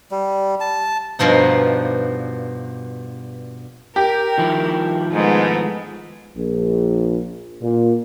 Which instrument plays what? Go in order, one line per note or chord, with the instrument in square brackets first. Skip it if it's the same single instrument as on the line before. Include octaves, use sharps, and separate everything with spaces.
[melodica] G3
A5
[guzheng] G2 B2 F3 D#4
[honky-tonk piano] G4 [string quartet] A#4
[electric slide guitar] D#3 F3 E4
[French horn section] G#2 [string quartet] G#3 A3 B3
[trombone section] A#1
A#2